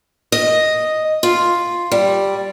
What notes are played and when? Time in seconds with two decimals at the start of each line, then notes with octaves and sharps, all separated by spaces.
0.32 D#5
1.23 F4
1.92 G3